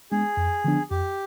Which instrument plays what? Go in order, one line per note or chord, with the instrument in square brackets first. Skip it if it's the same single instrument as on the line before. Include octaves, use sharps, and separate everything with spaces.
[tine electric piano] G#3 B3 D4 [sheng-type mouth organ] G#4
[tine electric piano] F2
D3 F3 B3 D4
[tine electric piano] F2 [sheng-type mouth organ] G4